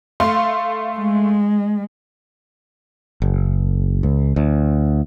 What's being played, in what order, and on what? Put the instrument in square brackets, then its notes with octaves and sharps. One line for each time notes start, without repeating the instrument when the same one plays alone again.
[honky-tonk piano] A3 F5 C6
[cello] G#3
[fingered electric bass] F#1
C#2
D2